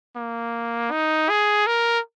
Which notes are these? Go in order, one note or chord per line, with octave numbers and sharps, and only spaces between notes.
A#3
D#4
G#4
A#4